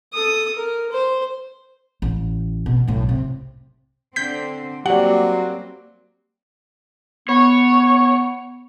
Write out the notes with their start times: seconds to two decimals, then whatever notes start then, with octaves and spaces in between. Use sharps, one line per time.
0.13 A4 D#6
0.55 A#4
0.92 C5
2.02 A1
2.66 B2
2.88 B1 A2
3.09 C3
4.16 D3 C4 G6 B6
4.86 F#3 G3 A#3 C4 G4 D5 F#5
7.29 B3 C#5